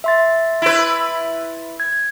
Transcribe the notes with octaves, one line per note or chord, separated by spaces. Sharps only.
E5 C6 A6
E4 B4
G#6